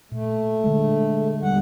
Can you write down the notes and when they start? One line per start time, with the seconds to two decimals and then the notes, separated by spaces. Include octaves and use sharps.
0.12 A#2 A3
0.64 D3 G#3
1.43 E2 G3 F#5